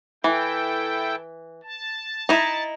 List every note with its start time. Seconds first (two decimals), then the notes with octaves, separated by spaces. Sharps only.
0.24 E3 E4 A4 G5
1.64 A5
2.29 D#4 E4